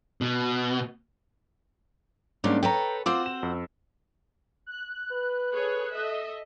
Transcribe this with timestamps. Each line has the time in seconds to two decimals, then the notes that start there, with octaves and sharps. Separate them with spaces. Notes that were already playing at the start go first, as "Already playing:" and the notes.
0.21 B2
2.44 G#2 G3 A#3 C#4 D4
2.63 A4 B4 C#5 G5 A#5
3.06 C4 F4 F#4 C5 D6 E6
3.26 E7
3.43 F2
4.66 F#6
5.12 B4
5.53 G#4 A4 C#5
5.93 A4 D#5 E5